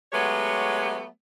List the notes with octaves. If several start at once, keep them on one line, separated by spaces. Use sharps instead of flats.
F#3 G#3 A3 B3 G4 C#5